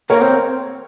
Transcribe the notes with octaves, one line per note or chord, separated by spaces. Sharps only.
A#3 A#4 C#5
C4